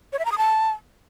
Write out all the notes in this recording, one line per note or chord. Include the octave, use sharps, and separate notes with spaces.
C#5
E5
A#5
D#6
A5